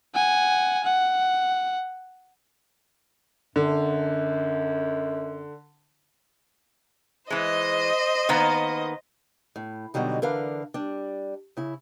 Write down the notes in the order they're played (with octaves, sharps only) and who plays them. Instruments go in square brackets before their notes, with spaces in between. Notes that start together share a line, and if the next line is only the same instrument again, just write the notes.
[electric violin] F#5 G#5
F#5
[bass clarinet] F#2 [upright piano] D3
[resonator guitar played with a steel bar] E3 G#3 [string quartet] C5 D#5
[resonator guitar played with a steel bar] D#3 A#3 B3
[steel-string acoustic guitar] A2
B2 D3 F#3 G3 D#4
D3 E3 D4 A#4 B4 F5
G3 D4
C#3 E4